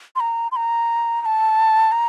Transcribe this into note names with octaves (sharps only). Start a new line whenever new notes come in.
C6
A#5
C6
A#5
A#5
A5
A#5